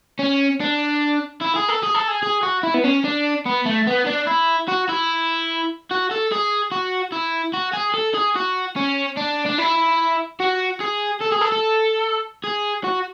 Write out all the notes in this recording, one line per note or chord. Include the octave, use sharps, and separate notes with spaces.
C#4
D4
E4
G#4
A4
G#4
A4
G#4
G#4
F#4
E4
B3
C#4
D4
B3
A3
B3
D4
E4
F#4
E4
F#4
A4
G#4
F#4
E4
F#4
G#4
A4
G#4
F#4
C#4
D4
D4
E4
F#4
G#4
A4
G#4
A4
A4
G#4
F#4